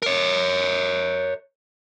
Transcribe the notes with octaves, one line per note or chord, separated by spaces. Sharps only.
A#4 C#5